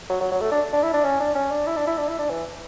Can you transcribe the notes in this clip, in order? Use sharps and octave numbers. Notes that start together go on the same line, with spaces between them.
F#3
F#3
F#3
A3
D4
D4
E4
D4
C#4
D4
C#4
D4
E4
D4
E4
D4
E4
D4
E3